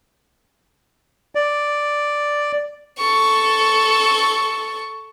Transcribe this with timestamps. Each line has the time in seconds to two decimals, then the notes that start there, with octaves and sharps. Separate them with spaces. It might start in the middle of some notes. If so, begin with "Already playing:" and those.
1.35 D5
2.98 A4 C#6